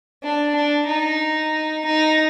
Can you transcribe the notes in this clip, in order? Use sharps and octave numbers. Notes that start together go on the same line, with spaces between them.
D4
D4
D#4
D#4